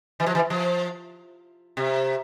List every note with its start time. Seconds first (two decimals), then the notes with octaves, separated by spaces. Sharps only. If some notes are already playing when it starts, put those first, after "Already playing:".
0.20 E3
0.26 F3
0.35 E3
0.50 F3
1.77 C3